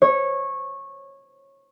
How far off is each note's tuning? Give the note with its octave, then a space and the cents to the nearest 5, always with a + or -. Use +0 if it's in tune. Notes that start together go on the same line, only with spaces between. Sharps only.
C#5 -15